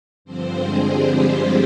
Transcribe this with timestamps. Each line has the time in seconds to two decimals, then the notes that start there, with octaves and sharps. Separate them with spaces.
0.25 G2 D3 F3 C4 C5
0.57 G#3 G#4
0.88 G3 G4
1.21 F3 F4